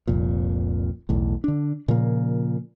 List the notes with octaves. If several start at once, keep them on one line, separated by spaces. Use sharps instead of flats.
F1 C2 F2 A#2
B1 E2 A2
D3 D4
A#2 C#3 F3 A#3